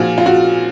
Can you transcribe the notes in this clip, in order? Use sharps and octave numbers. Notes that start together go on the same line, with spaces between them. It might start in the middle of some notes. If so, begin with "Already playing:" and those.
Already playing: A#2 F3 F4 F#4 G#4
F4
F#4